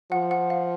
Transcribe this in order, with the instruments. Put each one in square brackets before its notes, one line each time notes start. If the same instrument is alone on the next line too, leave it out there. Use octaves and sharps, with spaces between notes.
[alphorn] F3 [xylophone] F#5
[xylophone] F#5
F5